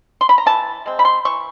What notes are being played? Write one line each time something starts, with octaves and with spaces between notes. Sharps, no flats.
C6
B5
A#5
E3 A5
G#3 C4
B5
C6
E3 C#6